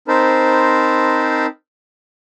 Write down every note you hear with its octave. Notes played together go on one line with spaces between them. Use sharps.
C4 D#4 A#4 C5 A5 B5